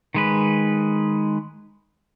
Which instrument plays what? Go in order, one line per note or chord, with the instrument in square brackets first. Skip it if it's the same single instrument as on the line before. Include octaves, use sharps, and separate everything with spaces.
[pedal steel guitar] D#3 G#3 B4